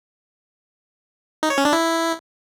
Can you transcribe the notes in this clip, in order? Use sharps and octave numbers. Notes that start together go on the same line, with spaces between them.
D#4
C#5
C#4
D4
E4